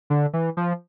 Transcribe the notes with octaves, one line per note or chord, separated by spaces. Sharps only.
D3
E3
F3